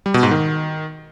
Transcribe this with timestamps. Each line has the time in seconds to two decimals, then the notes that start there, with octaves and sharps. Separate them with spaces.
0.06 G3
0.14 B2
0.23 G#2
0.31 D#3